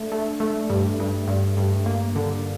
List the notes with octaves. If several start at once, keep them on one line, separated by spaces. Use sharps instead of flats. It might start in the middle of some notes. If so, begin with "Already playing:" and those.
Already playing: A3 D4
A3
A3
G2
G2
G2
G2
A#3
D3